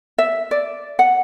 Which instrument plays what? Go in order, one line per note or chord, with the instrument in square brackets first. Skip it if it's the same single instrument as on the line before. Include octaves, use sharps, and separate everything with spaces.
[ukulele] E5
D5
F#5